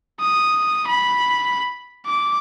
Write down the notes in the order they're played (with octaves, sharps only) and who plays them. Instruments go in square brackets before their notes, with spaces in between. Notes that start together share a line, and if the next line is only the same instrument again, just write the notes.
[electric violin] D#6
B5
D6